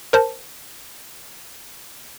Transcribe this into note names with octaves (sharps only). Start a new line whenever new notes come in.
A#4 C5 A5